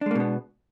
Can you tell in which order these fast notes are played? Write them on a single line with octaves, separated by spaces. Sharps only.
D4 G#3 A#3 B2 B3